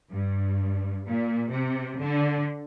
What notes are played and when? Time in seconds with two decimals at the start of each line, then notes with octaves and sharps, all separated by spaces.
0.12 G2
1.06 A#2
1.52 C3
1.99 D3